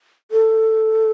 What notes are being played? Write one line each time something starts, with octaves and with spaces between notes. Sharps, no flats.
A4